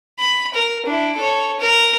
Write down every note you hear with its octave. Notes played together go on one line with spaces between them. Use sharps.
B5
A#4
D4 E4
A4 C#5
A#4